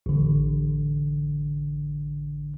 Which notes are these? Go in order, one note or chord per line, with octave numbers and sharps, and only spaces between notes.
A1 D3